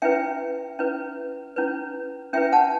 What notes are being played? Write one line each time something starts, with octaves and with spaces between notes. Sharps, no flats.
C#4 E4 B4 E5 G5
C#4 E4 B4
C#4 E4 B4
C#4 E4 B4 E5 G5
F#5 A5